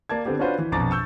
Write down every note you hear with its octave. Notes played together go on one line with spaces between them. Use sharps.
A#3 D5 A5 G#6
D3 B3 C4 G4
C#4 D4 F4 F#4 B4 C5
E3
A#1 F2 B2 A#5 D6 A6
C#6 E6 G6